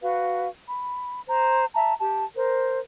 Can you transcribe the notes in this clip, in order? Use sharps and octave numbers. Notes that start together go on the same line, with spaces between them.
F#4 B4 F5
B5
C5 A#5
E5 A5 A#5
G4 A5
A#4 C5